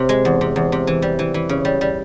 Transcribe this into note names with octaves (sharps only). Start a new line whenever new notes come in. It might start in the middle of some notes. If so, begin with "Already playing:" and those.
Already playing: C3
G#3
E2
C3
E2
C3
E3
G3
E3
E3
C#3
G3
G3